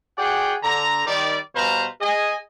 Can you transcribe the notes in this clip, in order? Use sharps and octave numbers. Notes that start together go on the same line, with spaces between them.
F#4 G#4 D5 F#5 G5
D3 A#5
D#3 G3 D5
B2 G3 B4 C5 F5 A#5
G#4 D#5 G#5